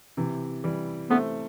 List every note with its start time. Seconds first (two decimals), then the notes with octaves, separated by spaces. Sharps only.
0.17 C3 E3
0.64 E3 G3
1.10 A3 B3 C4